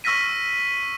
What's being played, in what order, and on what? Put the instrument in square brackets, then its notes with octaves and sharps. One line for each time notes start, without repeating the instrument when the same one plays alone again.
[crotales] C#6 E6 F6 A#6 B6 D#7